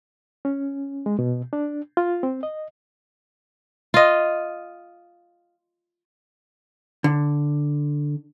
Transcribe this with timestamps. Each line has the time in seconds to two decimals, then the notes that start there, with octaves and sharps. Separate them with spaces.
0.45 C#4
1.06 G#3
1.19 B2
1.53 D4
1.97 F4
2.23 C4
2.43 D#5
3.94 F4 D#5
7.04 D3